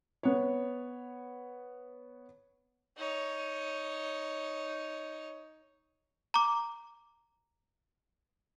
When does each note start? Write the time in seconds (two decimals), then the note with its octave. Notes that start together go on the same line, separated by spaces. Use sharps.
0.23 B3 C#5
2.98 D#4 C#5
6.34 A#5 D6